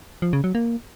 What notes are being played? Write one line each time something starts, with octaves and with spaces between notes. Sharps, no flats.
F3
C#3
F#3
A#3